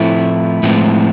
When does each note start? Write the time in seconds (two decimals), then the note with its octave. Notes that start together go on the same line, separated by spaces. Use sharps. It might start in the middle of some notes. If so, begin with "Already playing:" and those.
Already playing: A2 F3 A3 C4 E4
0.63 A2 F3 G#3 C4